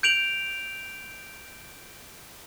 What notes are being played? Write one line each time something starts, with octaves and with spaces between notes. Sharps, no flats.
G6 D7 F7 F#7